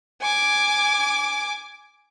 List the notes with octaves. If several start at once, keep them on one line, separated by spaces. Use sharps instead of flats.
G#5 D6